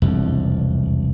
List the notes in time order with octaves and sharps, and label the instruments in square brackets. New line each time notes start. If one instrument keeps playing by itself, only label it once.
[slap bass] E1 C2 F2